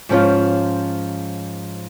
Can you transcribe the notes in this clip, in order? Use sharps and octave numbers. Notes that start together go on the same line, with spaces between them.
G#2 F3 C#4 F4